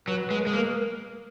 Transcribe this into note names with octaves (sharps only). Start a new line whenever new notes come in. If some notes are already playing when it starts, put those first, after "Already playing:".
F#3 B4
G#3
A#4
G#3
B4
A#3
A#4